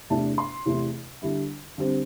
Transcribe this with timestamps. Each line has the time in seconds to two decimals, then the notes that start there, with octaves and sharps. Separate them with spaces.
0.10 E2 C3 A3 D4 A5
0.38 C6
0.66 E2 C3 E3 A3
1.22 D3 G3 E4
1.78 D3 G3 C4